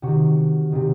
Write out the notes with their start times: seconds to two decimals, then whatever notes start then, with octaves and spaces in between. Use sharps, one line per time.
0.02 C3 D#3 F#4
0.72 C3 D#3